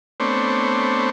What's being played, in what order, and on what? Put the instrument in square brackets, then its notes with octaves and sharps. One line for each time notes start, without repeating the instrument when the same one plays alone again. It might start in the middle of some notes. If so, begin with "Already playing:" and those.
[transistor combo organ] A3 B3 C4 D4 C5 C#5